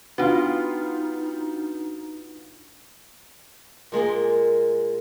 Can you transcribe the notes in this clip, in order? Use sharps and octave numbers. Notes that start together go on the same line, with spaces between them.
B3 D4 D#4 F4 F#4
A#2 G#3 A#3 G#4